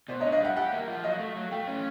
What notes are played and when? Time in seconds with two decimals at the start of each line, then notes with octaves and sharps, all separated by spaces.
0.08 B2 C5 D5
0.20 C#5 D#5
0.25 D4
0.32 D#5 F5
0.40 G3 E5 F#5
0.56 G4 E5 F#5
0.72 A#3
0.87 F3
1.04 F#3 D#5 F5
1.19 A3
1.36 F#3
1.51 A3 F5 G5
1.68 C#4